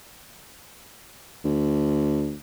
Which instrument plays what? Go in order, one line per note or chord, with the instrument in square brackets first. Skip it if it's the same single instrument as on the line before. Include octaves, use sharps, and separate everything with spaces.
[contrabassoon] D2